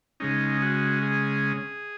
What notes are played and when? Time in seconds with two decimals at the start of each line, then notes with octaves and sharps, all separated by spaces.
0.20 C#3 G#3 C#4 D#4
0.62 F#4
1.02 G#4